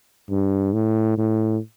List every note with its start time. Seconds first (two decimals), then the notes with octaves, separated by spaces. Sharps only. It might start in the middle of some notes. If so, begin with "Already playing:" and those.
0.30 G2
0.73 A2
1.18 A2